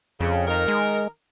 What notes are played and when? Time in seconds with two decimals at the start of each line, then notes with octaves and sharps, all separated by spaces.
0.20 F2 C#3
0.48 D#3 D#4 A#4
0.68 G#3